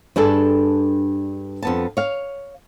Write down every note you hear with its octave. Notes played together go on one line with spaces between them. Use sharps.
G2 D4 G#4 A4
F2 B3 A5
C#5 F5